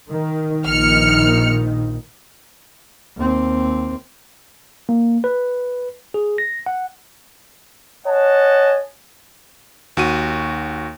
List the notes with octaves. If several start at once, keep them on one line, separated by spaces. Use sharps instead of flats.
D#3
A#1 D#3 F6 C#7
D#2 C4
A#3
B4
G#4
A#6
F#5
C#5 D#5 F#5 G#5 A5
D#2 F#4 D#7